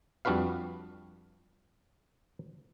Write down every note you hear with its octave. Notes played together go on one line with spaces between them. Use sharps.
F2 G3 D4 F#4 B4 F5